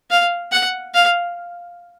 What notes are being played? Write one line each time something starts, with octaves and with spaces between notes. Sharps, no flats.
F5
F#5
F5